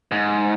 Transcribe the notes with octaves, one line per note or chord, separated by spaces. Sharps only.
G#2